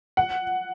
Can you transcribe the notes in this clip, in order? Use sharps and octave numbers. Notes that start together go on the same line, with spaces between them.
F#5